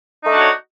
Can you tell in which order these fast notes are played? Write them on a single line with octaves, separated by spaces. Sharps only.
D#4 A3 D4 F#4 C#5